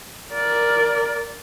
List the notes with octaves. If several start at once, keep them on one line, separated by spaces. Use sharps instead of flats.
A#4 D5